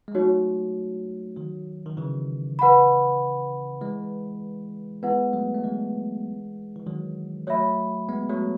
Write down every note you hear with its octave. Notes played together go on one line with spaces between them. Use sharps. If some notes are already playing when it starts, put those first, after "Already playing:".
G#3
F#3 A3 D#4 F#4 C#5
D#3 F#3
D#3
C#3 E3
B4 F#5 B5
E3 G#3
G#3 B3 E4 B4 F#5
F#3 A3
A3
E3 G#3
E3
D#3 F#3
F#3 A3 C#5 E5 B5
G#3 B3
F#3 A3